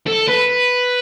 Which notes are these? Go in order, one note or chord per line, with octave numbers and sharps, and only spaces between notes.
A4
B4